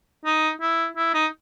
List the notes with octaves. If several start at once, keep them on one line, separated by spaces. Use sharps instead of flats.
D#4
E4
E4
D#4